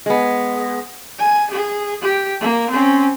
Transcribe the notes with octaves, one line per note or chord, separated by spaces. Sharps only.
G#3 B3
G#5
G#4
G4
A#3
C4 C#4